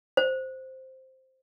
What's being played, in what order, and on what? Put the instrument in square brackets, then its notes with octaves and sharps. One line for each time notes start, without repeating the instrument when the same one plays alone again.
[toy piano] C5